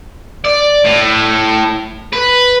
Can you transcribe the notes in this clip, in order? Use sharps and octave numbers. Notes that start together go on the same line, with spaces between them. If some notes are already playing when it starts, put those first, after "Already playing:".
D5
A2
B4